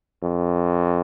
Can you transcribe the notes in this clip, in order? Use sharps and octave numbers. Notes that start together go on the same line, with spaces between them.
F2